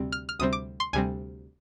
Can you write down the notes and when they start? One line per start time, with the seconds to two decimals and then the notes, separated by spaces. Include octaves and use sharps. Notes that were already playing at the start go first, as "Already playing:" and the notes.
Already playing: D2 C3 G3 C4
0.12 F6
0.29 F6
0.39 D2 C3 G3 C4 D#6
0.53 D6
0.80 C6
0.93 D2 C3 G3 C4 G#5